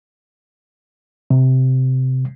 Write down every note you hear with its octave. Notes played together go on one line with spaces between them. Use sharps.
C3